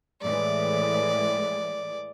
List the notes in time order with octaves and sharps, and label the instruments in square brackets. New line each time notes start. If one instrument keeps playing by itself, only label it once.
[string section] A2 E3 G#3 [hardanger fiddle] D5